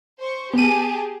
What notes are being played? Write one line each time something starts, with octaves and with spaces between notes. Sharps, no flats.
C5 C#6
B3 G4 G#4 A5 D#7